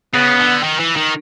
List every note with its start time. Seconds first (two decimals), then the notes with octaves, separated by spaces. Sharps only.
0.14 C#3 B3
0.39 D3
0.64 D#3
0.80 E3
0.96 D#3